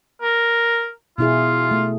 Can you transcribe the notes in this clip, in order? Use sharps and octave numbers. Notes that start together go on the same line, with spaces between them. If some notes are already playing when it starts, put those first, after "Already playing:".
A#4
B2 E4 F4 G#4
A3